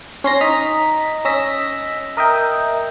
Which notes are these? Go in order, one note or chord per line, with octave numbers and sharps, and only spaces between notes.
C#4 C6 A#6
D#4 D#5 A#5 B6
C#4 D#5 E6 A#6 B6
A#4 D#5 E5 G5